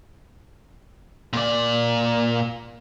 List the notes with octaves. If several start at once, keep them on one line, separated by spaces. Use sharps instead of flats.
A#2 D5